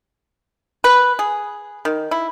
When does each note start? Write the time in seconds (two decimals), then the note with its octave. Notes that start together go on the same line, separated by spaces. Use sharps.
0.84 B4
1.19 G#4
1.85 D#3
2.11 E4